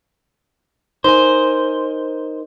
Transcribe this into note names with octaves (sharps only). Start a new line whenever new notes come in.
D#4 A#4 C5 G#5